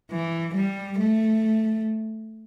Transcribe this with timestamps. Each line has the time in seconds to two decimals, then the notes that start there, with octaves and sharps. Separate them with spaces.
0.12 E3
0.55 G3
0.99 A3